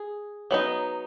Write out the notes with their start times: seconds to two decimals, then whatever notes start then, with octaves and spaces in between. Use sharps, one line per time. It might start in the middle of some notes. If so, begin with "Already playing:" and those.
Already playing: G#4
0.51 F#3 B3 D#4